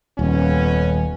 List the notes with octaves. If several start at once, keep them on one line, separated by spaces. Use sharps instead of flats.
D#1 F2 B3 C#4